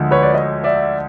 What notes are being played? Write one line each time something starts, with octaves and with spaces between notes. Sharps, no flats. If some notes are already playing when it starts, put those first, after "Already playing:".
Already playing: D2 D3 F3 G#3
B4 C#5
D5
C#5 D#5
D5 E5